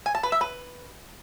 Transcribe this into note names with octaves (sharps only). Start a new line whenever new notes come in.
G#5
A5
B4
E5
B4